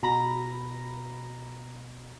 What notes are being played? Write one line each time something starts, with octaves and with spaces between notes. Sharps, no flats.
B2 A#5 B5 A#6